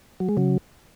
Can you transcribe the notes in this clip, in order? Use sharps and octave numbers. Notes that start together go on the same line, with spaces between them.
F#3
G#3
C#3 F#3